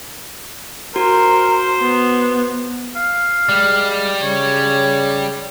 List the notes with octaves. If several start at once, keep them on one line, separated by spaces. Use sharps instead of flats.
F#4 A#4 C5
B3
F5
G3 G#3
C#3 C#5